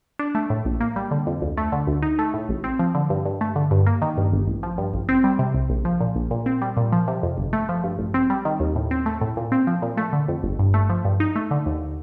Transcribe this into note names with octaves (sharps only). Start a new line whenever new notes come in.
D4
A3
A2
A#1
A#3
G3
D3
F2
D2
A3
D3
D2
D#4
A3
A2
A1
C4
F3
D3
G2
G2
A3
D3
G2
A#3
D#3
G2
G1
A1
F3
G2
A1
C4
G3
C3
C2
A#1
F3
A#2
A#1
A#2
C4
G3
A#2
F3
C3
F2
G1
A3
F3
G2
A1
C4
G3
D#3
D#2
A2
C4
A3
A2
A#2
C4
F3
A#2
A3
D3
F2
G1
G2
A3
F3
G2
D#4
A3
D3
D#2